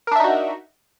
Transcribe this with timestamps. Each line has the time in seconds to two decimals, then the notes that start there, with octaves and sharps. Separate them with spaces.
0.07 A#4
0.12 D4
0.16 E5
0.20 D#4
0.24 F#4